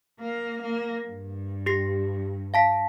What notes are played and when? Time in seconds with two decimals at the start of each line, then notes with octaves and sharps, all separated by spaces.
0.20 A#3 F5
0.62 A#3
1.06 G2
1.66 G4 A#6 C7
2.54 F5 A5 B6